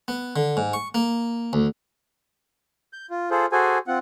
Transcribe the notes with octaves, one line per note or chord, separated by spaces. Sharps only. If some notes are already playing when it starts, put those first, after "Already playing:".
B3
D3
G#2
C#6
A#3
D2
G6
F4
F4 G#4 A4 C5
F#4 G#4 A4 C5 G#5
C4 F4 F#5